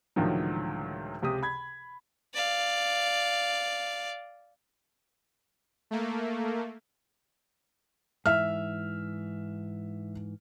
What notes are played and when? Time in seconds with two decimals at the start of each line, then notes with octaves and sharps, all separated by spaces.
0.16 C#2 A2 D3 D#3 F3 F#3
1.22 C#2 C3 G4 D#6
1.43 B5 G#6
2.34 D5 F5
5.91 A3 A#3
8.26 G#2 E3 E5 F6